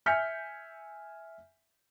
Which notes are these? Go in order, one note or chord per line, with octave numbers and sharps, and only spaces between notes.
E5 G#5 F6 G6 B6 C#7